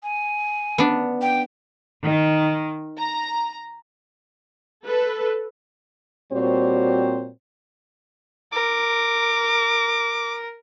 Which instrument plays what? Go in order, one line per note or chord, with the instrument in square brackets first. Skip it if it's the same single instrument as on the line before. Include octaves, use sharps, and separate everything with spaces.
[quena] G#5
[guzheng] B3 D4
[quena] G5
[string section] D#3
A#5
[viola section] A4 B4
[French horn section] A#2 G3 C4 F#4 C5 C#5
[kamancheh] A#4 [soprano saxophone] D6